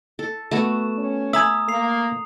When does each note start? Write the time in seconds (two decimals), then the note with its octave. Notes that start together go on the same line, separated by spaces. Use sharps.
0.19 A4
0.51 A3 B3 F#4 E7
0.98 C#4
1.33 E5 G#5 A#5 B5 D#6
1.69 A#3 C7 F7